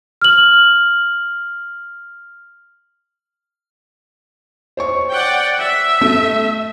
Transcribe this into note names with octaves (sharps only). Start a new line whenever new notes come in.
F6 F#7
C5 C#5 C#6
D5 F#5 G5
E5
A3